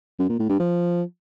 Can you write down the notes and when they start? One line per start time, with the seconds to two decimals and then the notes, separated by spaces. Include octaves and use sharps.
0.19 F#2
0.29 A#2
0.39 A2
0.49 G2
0.59 F3